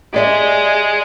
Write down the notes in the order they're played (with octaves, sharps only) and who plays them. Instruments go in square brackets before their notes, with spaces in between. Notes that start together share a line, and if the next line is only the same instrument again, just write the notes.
[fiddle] G#3 [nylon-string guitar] G4 D5 E5